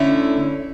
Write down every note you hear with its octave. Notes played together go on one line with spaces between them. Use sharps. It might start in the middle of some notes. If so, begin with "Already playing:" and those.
Already playing: D3 A3 C#4 E4